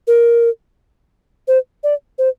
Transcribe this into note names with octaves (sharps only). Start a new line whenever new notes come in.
A#4
C5
D5
C5